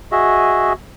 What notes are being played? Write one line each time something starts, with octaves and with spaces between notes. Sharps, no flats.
F#4 G#4 D#5 E5